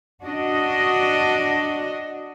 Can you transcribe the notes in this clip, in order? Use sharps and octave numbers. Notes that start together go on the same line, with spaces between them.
D4 F#4 D#5